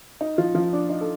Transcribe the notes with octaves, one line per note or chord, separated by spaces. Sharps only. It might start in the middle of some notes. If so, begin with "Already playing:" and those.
D#4
F3 F4
F3 F4
D4
D#4
A4